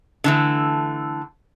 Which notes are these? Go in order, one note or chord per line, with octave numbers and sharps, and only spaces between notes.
D3 E3 A3